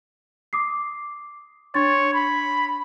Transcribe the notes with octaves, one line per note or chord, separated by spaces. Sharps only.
D6 D#6 C7
D4 C#5 C6 A6
B5